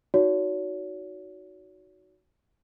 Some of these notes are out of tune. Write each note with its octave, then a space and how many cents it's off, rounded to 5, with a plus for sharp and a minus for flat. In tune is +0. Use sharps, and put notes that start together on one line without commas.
D#4 +20 F#4 +0 C#5 +40